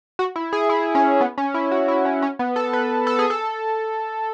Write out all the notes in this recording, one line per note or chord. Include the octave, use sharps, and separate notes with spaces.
F#4
E4
G#4
E4
C#4
B3
C#4
E4
F#4
E4
C#4
C#4
B3
A4
B4
A4
G#4
A4